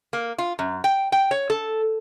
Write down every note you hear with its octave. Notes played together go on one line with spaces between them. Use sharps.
A#3
F4
F#2
G5
G5
C#5
A4